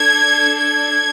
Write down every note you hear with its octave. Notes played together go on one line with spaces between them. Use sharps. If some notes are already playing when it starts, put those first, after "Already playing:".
Already playing: D4 A4 G#6
G#6